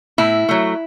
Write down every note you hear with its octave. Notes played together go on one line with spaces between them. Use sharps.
A2 E4
F#3 A3